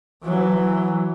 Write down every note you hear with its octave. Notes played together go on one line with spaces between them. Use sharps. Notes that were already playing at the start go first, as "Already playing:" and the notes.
E3 F#3